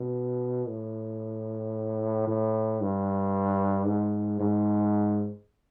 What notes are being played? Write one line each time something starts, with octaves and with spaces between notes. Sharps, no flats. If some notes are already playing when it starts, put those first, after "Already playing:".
Already playing: B2
A2
A2
G2
G#2
G#2